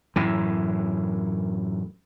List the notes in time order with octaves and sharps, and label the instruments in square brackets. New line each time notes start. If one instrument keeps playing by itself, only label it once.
[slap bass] F#2 A2 E3